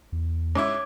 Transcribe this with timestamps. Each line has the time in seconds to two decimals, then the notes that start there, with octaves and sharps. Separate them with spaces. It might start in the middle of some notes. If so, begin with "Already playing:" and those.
0.12 E2
0.55 G#2 C#4 E4 C#5 D6 G#6